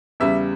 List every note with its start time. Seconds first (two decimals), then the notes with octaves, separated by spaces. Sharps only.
0.20 E2 C#3 G3 E5